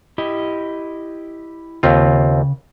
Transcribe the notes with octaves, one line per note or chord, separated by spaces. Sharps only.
E4 G4 D#5
D#2 C#3 C4 F4